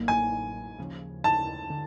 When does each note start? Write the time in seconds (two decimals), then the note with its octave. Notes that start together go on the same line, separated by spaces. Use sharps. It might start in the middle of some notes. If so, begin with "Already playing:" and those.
Already playing: A1 A2 F#3 A#3 D#4
0.08 G#5
0.78 D#2 C#3 F3
1.24 A5
1.70 D3